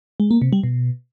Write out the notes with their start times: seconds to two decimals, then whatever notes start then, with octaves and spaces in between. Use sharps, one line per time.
0.20 G#3
0.31 A#3
0.42 C3
0.53 G3
0.64 B2